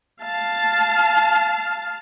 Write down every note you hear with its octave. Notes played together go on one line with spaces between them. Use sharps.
F5 A5